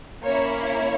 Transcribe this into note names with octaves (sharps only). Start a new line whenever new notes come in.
A#3 C#4 E4 C#5
C#5